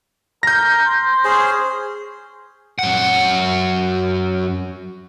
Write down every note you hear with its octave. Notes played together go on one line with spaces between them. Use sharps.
A#4 G6 A#6
C6
C#4 G#4 C5
F#2 F#5